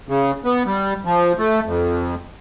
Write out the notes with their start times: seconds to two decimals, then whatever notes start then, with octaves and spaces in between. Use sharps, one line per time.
0.09 C#3
0.45 B3
0.66 G3
1.05 F3
1.38 A3
1.65 F2